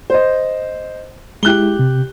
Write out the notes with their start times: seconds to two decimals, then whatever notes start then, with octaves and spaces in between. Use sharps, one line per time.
0.10 C5 D#5
1.43 G#3 E4 G4 F#6 G7
1.79 C3